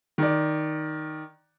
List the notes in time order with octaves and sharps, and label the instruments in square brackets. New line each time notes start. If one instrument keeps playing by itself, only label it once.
[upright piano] D#3 D5